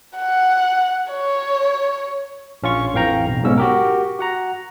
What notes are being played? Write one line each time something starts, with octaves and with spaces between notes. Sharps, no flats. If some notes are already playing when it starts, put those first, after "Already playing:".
F#5
C#5
A#1 C#4 F4 C#6
A1 F2 E3 F5 G5 A#5
B1
B1 G#2 B2 C#4 E6
F#4 G4 A#4
F#4 F#5 A#5